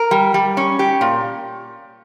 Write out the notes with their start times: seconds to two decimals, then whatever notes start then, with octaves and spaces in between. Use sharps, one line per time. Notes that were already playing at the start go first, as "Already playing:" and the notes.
Already playing: A#4
0.11 G3
0.34 G3
0.57 C#4
0.79 G4
1.01 A#2